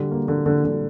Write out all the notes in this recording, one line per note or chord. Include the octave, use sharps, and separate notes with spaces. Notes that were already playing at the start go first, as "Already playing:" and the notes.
Already playing: D3 G3
A#3
D3
D3
D3